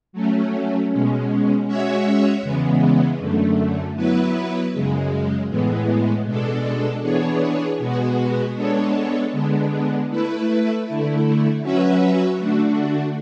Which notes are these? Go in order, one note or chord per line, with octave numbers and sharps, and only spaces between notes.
F#3 A3 C#4
B2 G#3 C#4
G#3 C#4 F#4 C#5 E5
E2 C#3 E3 G#3 B3
F#2 D3 A3
F#3 B3 E4 B4
F#2 C#3 G#3
A2 E3 G#3 B3
B2 G#3 D4 A4
E3 B3 D4 G#4 C#5
B2 G#3 B3 F#4
G#3 B3 D4 A4 C#5
D3 G#3 B3 D4
A3 E4 B4
D3 A3 E4
F#3 C#4 F#4 B4 E5
D3 A3 D4 F#4